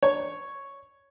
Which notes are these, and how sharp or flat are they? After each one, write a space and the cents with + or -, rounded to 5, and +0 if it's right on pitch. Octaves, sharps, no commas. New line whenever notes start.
C#5 +0